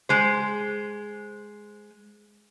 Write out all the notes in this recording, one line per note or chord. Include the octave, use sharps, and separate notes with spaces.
G#3 C5